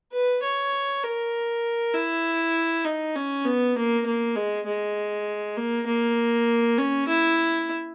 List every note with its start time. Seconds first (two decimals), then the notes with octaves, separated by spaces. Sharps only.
0.12 B4
0.43 C#5
1.03 A#4
1.94 E4
2.85 D#4
3.15 C#4
3.45 B3
3.76 A#3
4.06 A#3
4.36 G#3
4.66 G#3
5.57 A#3
5.87 A#3
6.78 C#4
7.08 E4